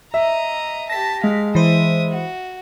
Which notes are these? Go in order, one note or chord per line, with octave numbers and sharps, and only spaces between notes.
D#5 E5 A#5
G4 A5 A#6 B6
G#3 F5
E3 C5 E5 D#6
F#4